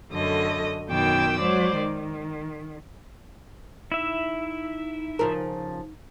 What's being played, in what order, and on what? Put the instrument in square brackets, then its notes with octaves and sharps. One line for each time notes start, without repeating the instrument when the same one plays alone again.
[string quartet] F#2 D3 A3 D#5
F#2 B2 D#3 G5 D6 E6
F#3 G#3 C5 D5
D#3
[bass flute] D#4 [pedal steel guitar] E4 E5
[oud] C#3 F3 A#4